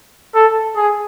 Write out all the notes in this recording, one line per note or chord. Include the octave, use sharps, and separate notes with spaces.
A4
G#4